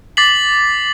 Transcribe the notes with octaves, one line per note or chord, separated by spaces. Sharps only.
D6 A6 B6 C7 F#7